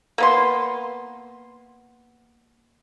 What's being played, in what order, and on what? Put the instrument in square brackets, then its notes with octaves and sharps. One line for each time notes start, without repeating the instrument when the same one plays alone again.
[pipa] A#3 B3 C6